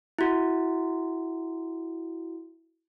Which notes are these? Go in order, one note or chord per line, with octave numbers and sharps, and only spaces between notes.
E4 F#4